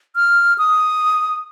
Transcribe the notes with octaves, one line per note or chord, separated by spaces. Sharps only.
F6
D#6